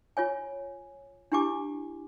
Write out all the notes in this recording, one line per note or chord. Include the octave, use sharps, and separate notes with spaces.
F4 C#5 G#5
D4 E4 G4 G#5 D6